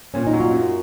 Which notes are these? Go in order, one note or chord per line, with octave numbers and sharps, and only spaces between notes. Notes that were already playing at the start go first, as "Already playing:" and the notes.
A#2 C#4
D#4
F#3
F4
F#2